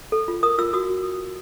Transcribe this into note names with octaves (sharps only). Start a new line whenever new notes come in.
A4
F4
A#4 D#6
F4 E6
F#4 D#6